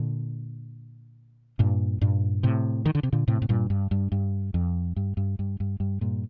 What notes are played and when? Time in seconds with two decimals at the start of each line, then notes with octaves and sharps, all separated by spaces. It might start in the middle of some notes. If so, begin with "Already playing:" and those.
Already playing: A#2 D3
1.59 G2 A#2
2.01 G2 A#2
2.43 A2 C3
2.86 D#3
2.95 D3
3.03 C3
3.13 A#2 D3
3.28 A2 C3
3.42 A2
3.49 G2 A#2
3.70 G2
3.91 G2
4.12 G2
4.54 F2
4.96 G2
5.17 G2
5.39 G2
5.60 G2
5.80 G2
6.01 G2 A#2